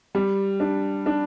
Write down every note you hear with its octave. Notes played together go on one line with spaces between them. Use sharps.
G3
D4
D4